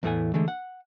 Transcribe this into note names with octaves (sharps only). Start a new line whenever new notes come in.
E2 A2 E3 A3 F#5 G#5
D3 E3 G#3 A3
F#5